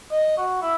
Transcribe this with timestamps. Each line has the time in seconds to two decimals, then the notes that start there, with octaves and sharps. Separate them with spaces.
0.11 D#5
0.37 F#4
0.62 E4